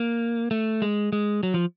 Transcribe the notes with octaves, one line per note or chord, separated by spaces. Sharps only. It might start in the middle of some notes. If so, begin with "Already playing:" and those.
Already playing: A#3
A3
G#3
G#3
F#3
F3